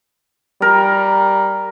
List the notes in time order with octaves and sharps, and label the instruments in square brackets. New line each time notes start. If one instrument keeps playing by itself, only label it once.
[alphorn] G3 [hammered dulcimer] A#4